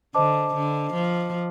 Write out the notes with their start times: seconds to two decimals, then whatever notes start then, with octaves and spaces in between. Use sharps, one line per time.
0.15 D3 C5 D#5 A5 D6
0.55 D3
0.93 F3